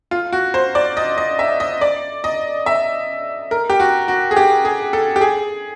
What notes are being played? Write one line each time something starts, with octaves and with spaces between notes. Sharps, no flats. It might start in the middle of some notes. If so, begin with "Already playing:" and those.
F4
F#4
C5
D5
D#5
D#5
E5
D#5
D5
D#5
E5
A#4
G4
F#4
F#4
G#4
G4
G#4
A4
G4
G#4